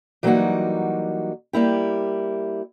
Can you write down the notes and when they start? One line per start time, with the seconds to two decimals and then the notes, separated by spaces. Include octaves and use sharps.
0.23 E3 F#3 G3 A#3 D#4 F#4
1.53 G3 A#3 E4 G4